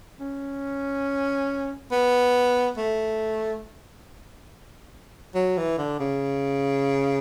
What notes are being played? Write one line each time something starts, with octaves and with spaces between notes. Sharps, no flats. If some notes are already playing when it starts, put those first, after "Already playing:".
C#4
B3
A3
F#3
E3
D3
C#3